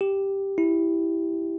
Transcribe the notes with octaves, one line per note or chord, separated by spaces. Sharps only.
G4
E4